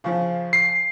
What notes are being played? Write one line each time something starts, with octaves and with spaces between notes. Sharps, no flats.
C#3 F3
C7